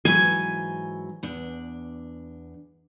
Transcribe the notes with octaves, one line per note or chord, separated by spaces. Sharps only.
G#2 E3 F#3 G#5
E2 D4